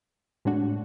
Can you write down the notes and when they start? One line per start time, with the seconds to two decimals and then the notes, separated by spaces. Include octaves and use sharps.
0.45 A2 G#3 D4 F#4